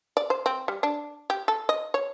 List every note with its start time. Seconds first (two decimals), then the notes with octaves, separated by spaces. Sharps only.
0.17 D5
0.30 C5
0.46 C4
0.68 G3
0.83 D4
1.30 G4
1.48 A4
1.69 D#5
1.94 C#5